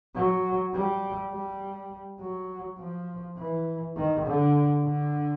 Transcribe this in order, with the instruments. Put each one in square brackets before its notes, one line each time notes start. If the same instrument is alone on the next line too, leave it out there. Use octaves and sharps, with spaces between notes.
[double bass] F#3
G3
G3
F#3
F3
E3
D#3
D3
D3